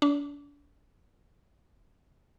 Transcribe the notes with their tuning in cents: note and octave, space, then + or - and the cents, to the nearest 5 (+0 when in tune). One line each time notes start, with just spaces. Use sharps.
D4 -35